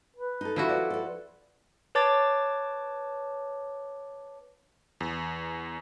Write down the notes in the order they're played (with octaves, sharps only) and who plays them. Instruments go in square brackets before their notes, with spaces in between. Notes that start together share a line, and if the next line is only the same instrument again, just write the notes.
[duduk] B4
[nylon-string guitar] D#4 A4
[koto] F3 E4 F#4
[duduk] B4 [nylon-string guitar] D5
[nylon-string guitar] A4 D5
[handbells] B4 C#5 A5 D6 A6
[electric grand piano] E2